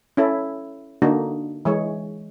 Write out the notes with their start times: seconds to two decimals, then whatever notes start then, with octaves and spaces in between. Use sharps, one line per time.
0.17 C#4 E4 A4
1.02 D3 A#3 D4 D#4 F#4
1.65 E3 G#3 C#5